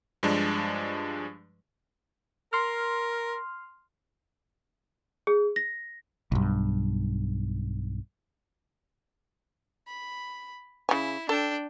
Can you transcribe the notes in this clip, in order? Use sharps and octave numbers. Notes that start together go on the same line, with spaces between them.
G2 F3 G#3 D4
A#4 C6 F6
G#4
A#6
B1 G2
B5
C#3 E4 G#5
D4 A4 G5